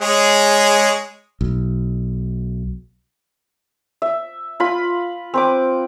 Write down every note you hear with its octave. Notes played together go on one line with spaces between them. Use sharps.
G#3 G#4 C#5
B1
E5
F4 B5
C4 B4 D6